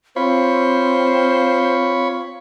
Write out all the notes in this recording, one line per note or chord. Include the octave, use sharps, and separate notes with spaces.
C4 F4 C5 C#5 B5